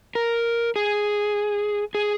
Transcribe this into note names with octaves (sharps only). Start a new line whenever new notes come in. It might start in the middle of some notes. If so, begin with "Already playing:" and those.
A#4
G#4
G#4